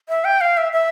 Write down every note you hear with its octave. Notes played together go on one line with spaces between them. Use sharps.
E5
G5
F5
E5
E5